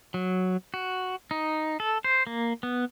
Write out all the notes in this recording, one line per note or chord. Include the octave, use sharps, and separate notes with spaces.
F#3
F#4
D#4
A4
C5
A#3
B3